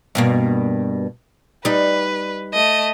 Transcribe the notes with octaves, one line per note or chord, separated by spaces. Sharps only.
G2 B2 A#3
G3 D#4 B4
A3 D#5